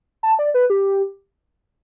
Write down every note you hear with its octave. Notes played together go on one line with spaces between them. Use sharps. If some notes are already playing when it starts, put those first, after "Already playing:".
A5
D5
B4
G4